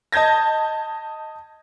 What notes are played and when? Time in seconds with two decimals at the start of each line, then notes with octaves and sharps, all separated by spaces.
0.12 D#5 A5 G6 G#6 A#6